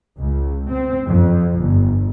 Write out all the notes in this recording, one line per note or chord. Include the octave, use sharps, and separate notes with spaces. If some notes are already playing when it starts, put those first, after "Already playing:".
C#2
C4
F2
G1